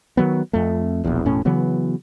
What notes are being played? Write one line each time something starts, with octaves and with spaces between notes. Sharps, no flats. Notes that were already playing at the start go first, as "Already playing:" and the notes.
D#3 F#3 B3
F2 A3
E1 A#1 E2
E1 A2 C#4
C#3 E3 F#3 B3